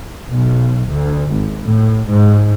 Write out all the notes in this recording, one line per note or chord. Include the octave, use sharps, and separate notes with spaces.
B1
D2
G#1
A2
G#2